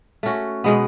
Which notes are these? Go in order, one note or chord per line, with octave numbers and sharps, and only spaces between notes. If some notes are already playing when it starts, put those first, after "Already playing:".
A3 C#4 F#4
B2 G#3 B3